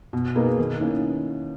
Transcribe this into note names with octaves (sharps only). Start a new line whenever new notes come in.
B2
A#3 D#4 G#4 B4
D#3
A#3 C#4 E4